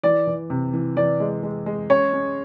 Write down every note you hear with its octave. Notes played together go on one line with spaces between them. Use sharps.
E3 D5
E3
C3
E3
E3 D5
G#3
G#3
G#3
C#4 C#5
C#4